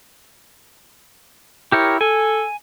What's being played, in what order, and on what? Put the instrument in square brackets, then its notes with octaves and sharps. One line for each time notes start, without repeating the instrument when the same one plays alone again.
[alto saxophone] E4 [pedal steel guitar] G4 A#4 C#5
[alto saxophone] A4 [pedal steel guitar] G#5